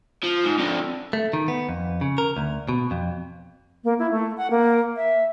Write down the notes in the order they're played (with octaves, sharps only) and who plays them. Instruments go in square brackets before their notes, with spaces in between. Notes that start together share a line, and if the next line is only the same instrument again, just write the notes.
[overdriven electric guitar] F3
G#2
F2 D3
[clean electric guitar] A3
D#3
B3
F2
C#3
A#4
D2
B2
F2
[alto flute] A#3
E4
A3
F#5
A#3
E5